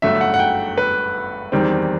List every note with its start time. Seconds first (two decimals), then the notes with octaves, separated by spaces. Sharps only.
0.02 G1 G2 F#3 A3 E5
0.21 F#5
0.34 F#5
0.39 G5
0.78 B4
1.52 E2 D#3 G3 C4